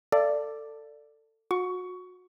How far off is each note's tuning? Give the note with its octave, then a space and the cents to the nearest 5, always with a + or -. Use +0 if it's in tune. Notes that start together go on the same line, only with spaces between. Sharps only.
A4 +20 D5 +0 F5 -45
F#4 -30 C#6 +15